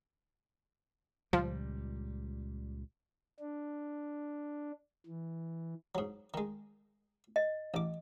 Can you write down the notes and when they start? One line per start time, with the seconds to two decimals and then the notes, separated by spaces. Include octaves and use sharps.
1.33 C#2 A#2 F3 G3
3.40 D4
5.06 E3
5.95 G#2 F#3
6.34 D#3 G#3
7.36 D#5
7.74 A1 D6